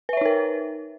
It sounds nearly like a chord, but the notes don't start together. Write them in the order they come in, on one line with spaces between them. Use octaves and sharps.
B4 E5 C#5 D#4 A#4